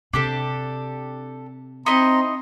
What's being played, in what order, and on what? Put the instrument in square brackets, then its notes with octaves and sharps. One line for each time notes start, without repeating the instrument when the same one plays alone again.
[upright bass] C3 [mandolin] D4 G4 A4
[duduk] C4 [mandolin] D#4 E4 D#5 [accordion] A#5 C6